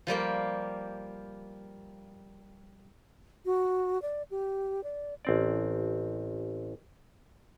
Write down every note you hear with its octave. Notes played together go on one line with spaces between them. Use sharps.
F3 G3 A#3 G4
F#4
D5
G4
D5
A1 C4 D5